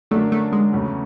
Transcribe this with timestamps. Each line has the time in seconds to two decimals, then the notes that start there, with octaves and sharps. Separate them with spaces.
0.11 F#2 D3 F#3 A3 A#3 D4
0.32 A3
0.53 G#3
0.72 E2 C#3 F#3 A3